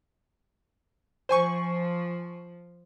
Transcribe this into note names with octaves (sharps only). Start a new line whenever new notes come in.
F3 C5 G#5 C#6